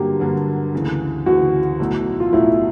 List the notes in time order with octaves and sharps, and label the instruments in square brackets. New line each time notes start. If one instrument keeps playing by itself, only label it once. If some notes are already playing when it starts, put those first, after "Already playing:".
Already playing: [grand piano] G2 D3 F#3 A#3 [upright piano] G4
[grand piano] G2 D3 F#3 A#3
D2 C#3 E3
[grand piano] D2 C#3 E3 [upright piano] F#4
[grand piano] B1 A2 F#3 A3
[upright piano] F4
[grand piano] B1 A2 F#3 A3 [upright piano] E4